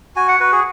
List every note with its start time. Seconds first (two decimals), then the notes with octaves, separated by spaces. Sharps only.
0.16 F#4 G#5
0.28 F#5
0.40 F#4 B4
0.52 G#4